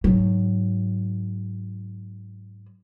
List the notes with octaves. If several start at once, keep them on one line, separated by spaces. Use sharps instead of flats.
G#2 F#3